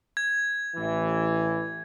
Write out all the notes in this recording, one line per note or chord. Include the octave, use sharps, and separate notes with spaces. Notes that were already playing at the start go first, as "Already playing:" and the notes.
G#6
A1 E3